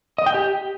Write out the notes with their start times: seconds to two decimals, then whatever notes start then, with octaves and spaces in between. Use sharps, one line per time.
0.18 D#5
0.26 G5
0.34 G4